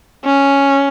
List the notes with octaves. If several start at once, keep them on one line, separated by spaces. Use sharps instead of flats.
C#4